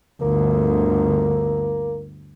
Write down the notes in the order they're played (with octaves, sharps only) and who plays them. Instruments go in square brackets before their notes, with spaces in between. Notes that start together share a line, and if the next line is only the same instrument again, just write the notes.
[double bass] G1 D2 [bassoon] A#3